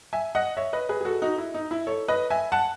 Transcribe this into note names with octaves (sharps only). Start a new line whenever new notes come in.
E5 G#5
D#5 F#5
C#5 E5
B4 D#5
G#4 B4
G#4
F#4 A4
D#4 F#4
E4
D#4
E4
A4 C#5
B4 D#5
E5 G#5
F#5 A5